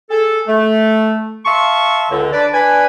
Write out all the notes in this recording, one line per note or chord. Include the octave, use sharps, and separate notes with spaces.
G#4 A4
A3
E5 F5 A5 C6 C#6
C#2 D3
D4 B4 D5
D4 B4 G#5